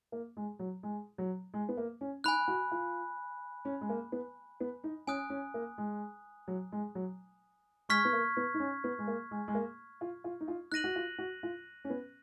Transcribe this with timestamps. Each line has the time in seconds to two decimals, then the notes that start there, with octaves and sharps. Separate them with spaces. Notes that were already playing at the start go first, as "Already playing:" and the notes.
0.12 A#3
0.37 G#3
0.59 F#3
0.83 G#3
1.18 F#3
1.54 G#3
1.69 B3
1.77 A#3
2.01 C#4
2.24 D#4 G#5 B5 F#6
2.48 F#4
2.71 F4
3.65 C#4
3.81 G#3
3.89 A#3
4.12 B3
4.60 B3
4.84 D#4
5.07 C#4 G#5 D#6 F#6
5.30 C#4
5.54 A#3
5.78 G#3
6.48 F#3
6.72 G#3
6.95 F#3
7.89 G#3 C#6 F6 G#6 B6
8.05 B3
8.13 A#3
8.37 B3
8.54 D#4
8.60 C#4
8.84 B3
8.99 G#3
9.08 A#3
9.31 G#3
9.48 G#3
9.55 A#3
10.01 F4
10.24 F4
10.41 D#4
10.48 F4
10.72 D#4 F#6 A#6 D#7 F#7
10.84 F#4
10.96 F4
11.19 F#4
11.43 F4
11.85 C#4
11.90 B3